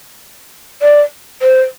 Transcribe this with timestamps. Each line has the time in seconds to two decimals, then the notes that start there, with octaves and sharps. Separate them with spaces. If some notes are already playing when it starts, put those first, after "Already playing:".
0.82 D5
1.42 C5